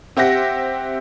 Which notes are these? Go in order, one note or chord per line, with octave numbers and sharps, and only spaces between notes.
C4 G4 E5 F#5 A#6